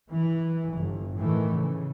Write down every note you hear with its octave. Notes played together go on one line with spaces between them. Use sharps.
E3
G1
A2 D#3 E3 A3
C#3